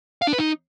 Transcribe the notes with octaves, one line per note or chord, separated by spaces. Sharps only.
F5
D4
B4
D#4